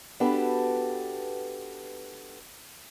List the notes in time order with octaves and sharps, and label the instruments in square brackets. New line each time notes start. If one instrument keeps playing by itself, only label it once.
[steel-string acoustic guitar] B3 D4 F#4 G4 A4 B4